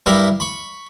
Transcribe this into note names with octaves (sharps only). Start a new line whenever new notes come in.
G2 E4 G4 A#4 E5 B5
B5 C#6